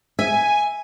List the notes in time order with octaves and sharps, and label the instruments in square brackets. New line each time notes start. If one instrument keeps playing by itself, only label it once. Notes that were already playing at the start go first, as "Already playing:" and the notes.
[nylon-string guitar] E5 [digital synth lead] G#5